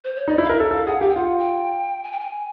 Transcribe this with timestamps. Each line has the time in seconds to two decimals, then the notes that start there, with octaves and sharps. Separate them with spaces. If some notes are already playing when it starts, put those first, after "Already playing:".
0.04 C5
0.16 C#5
0.28 D#4 D5
0.38 E4
0.44 F5
0.49 A#4 E5
0.60 A4
0.71 A4 F5
0.86 G#4 F#5
1.01 G4 F5
1.09 G5
1.16 F4 F#5
1.38 G5
2.04 G#5
2.12 G5
2.19 G#5